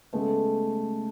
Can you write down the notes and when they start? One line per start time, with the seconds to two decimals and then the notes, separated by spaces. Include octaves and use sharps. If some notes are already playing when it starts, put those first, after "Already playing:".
0.13 C#3 G#3 A3 B3